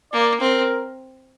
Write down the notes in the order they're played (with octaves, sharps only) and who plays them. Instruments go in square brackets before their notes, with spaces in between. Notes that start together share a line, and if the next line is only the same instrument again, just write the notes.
[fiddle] A#3 [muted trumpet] D5
[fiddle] C4 [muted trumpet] A#4